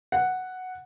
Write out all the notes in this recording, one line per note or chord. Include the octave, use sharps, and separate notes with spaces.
F#5